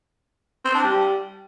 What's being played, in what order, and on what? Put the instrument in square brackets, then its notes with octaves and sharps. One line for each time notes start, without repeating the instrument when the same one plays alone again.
[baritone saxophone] C4
D4
G3